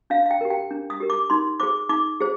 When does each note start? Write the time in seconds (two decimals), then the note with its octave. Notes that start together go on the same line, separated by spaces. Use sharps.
0.10 D4 F5
0.26 F5
0.31 G5
0.41 G4 A#4
0.50 G5
0.71 D4
0.90 D#6
1.00 G4 A#4
1.10 D6
1.30 D#4 C6
1.60 G#4 C5 D6
1.89 D#4 D6
2.20 G#4 C5